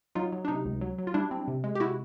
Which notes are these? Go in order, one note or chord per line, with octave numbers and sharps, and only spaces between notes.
F#3 D#4 F4
F#3
D4
C3 D#4
C#2
F#3
F#3
F4
G3 D4 E4
C4
C3
G#3
G4
C3 E4 F#4